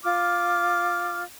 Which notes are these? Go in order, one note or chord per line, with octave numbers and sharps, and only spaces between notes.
F4 D6 F6